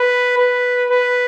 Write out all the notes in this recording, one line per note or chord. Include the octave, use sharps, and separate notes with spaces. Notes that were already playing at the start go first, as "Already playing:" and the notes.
Already playing: B4
B4
B4